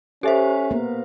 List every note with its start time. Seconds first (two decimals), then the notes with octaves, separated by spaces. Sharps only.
0.23 C#4 G4 A4 C5 E5
0.71 A#3 B3 A#4